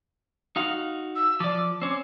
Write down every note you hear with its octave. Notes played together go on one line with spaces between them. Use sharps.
D#4 F#4 F5
E6
F3 D5 D6
C4 C#4